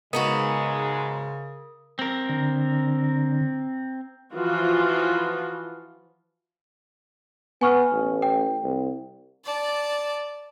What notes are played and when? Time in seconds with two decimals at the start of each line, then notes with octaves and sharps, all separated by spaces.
0.13 G#2 C#3 G#3 B3 D#4 F#4 A#4 D#6
1.99 C4 A#4
2.29 D3
4.33 E3 F3 F4 F#4
7.61 B3 G#5 C#6 F6
7.92 A1
8.22 G5
8.64 C2
9.45 D5 A5